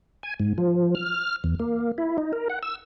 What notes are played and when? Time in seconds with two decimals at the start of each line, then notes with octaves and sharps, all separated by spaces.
0.23 G#5
0.40 G#2
0.58 F3
0.95 F6
1.44 E2
1.60 A#3
1.98 E4
2.18 D#4
2.33 A#4
2.50 F#5
2.63 E6